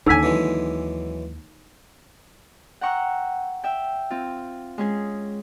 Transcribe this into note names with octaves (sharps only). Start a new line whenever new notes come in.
D#2 D3 C#4 D#4 G#5 E6 B6
E3 F#3 G#3
F#5 G5 A#5 C#6 E6 F#6
E5 G5
C4 F4
G#3 C#4 G#4